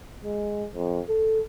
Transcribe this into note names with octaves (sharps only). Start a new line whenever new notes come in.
G#3
F2
A4